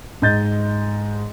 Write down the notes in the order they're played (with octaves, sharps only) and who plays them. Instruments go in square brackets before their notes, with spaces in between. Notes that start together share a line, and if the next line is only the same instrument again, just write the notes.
[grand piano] G#2 D#5 G6 A6